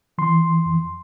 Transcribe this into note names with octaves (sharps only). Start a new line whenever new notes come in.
E3 C6
F2